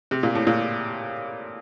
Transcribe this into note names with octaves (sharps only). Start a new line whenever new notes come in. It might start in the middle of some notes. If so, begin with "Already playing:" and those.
C3
A#2
A2
A#2